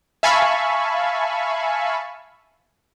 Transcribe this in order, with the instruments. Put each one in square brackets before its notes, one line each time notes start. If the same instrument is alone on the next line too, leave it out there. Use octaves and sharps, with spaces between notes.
[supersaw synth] E5 F5 G#5 A5 B5 C#6